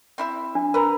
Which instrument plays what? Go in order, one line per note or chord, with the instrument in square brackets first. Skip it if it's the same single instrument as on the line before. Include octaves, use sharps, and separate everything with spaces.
[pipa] C4 E4 E5
[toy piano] D4
[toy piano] A#4 [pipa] B4 A#5